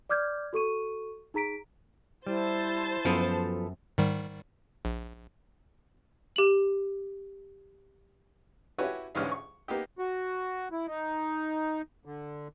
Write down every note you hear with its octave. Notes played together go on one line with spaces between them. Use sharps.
D5 D6 F6 G6 G#6
F#4 A4 C#6 D#7
D#4 G#4 A#5 B6 D7
G3 E4 C5 A5
F#2 F3 B3 A4
G#2 D#3 G3
A#1
G4 F#7
E4 F#4 G4 B4 C#5 G#5
C#2 G#2 D3 E3 C#4 F6
C#6
A#3 B3 D#4 G4
F#4
E4
D#4
D3